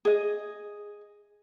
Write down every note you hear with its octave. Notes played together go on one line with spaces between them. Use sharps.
G#4 D#5